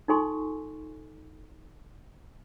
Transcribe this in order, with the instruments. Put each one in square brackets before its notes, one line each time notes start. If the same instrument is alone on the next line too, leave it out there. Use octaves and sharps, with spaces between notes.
[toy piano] D#4 F4 A4 G#5 C6 C#6